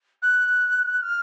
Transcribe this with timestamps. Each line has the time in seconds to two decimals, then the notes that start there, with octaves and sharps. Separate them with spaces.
0.22 F#6
1.02 F6